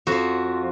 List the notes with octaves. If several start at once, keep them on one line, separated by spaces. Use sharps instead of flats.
F2 F3 F#4